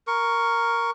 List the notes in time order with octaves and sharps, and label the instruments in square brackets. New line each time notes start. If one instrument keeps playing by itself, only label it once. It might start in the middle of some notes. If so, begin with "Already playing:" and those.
[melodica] A#4 C#6